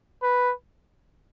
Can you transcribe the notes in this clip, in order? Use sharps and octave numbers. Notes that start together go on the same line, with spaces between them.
B4